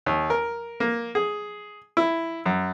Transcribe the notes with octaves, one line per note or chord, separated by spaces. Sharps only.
D#2
A#4
A#3
G#4
E4
F#2